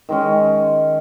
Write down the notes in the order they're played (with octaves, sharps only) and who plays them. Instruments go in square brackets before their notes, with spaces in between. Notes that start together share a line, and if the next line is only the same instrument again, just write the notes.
[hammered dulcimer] D#3 G#3 C#4